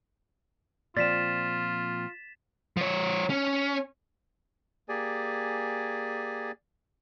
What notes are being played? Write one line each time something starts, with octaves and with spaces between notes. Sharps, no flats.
A#2 F3 C4 F4 D5 A6 B6 E7
F3 C#5
C#4
A#3 G4 G#4 D5 G#5